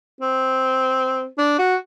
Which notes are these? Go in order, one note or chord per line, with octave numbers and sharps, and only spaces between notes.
C4
D4
F#4